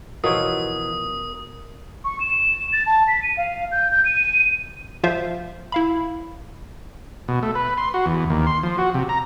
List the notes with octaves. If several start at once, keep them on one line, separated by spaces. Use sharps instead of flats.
B2 E3 F3 F4 A#4 C#5 D#6
C#6
E7
A6
A5
B6
D#7
F5
G6
G6
D#7
F3 F4 C5 E5 F5
E4 F5 B5
B2
A3
B4
C6
F#4
E2
D#2
C6
F3
F#4
C3
A#5